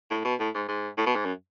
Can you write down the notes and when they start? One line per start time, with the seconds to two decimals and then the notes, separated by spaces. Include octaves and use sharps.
0.11 A2
0.25 B2
0.39 A2
0.54 G#2
0.69 G#2
0.98 A2
1.07 B2
1.16 G#2
1.26 F#2